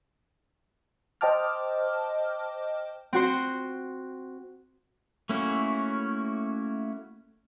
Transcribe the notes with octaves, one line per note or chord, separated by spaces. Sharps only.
C5 D#5 G5 A5 D6 F6
C4 F#4 C5
A3 A#3 C#4 E4 F#4